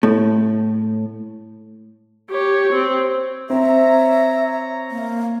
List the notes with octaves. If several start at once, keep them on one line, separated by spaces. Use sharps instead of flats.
A2
G4 C#5
C4
C4 C#5 E5 A#5
A#3